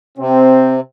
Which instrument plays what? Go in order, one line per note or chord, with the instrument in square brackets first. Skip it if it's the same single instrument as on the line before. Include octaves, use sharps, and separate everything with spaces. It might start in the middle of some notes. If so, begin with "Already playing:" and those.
[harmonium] C3 [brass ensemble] C4